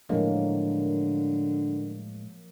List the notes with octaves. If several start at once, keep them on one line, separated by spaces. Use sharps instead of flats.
A2 D3 F3 F#3 G#3 A#3